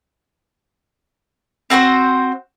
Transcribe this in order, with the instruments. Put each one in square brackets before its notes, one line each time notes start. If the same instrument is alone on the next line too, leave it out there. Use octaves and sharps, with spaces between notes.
[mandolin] C4 F#4 B4 C5